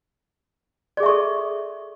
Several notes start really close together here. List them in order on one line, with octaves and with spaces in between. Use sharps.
D5 G#4 E5 C#6 A4